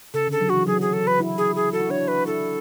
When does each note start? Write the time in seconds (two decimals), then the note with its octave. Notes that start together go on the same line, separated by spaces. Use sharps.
0.14 C#3 A4
0.27 D3 A4
0.41 F#3
0.49 E3 F#4
0.67 F#3 G#4
0.81 G#4
0.93 A4
1.07 B4
1.20 E4
1.38 G#4
1.55 G#4
1.72 F#4 A4
1.81 E4
1.89 D4 C#5
1.97 E4
2.08 B4
2.26 E4 A4